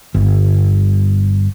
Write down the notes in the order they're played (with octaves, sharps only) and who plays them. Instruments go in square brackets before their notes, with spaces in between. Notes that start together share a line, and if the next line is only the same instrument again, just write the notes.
[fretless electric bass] G1